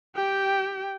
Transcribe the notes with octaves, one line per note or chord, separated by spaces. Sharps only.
G4 G5